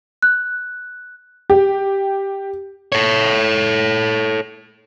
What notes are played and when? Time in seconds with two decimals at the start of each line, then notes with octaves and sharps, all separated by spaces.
0.22 F#6
1.50 G4
2.92 A4 C#5